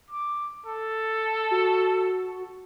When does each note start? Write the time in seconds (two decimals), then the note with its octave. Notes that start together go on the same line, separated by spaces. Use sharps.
0.10 D6
0.66 A4
1.51 F#4